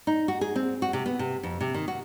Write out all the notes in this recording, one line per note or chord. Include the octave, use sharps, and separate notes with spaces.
D#4
F#4
G#4
C4
F#4
C3
B3
C3
F2
C3
D#3
F#4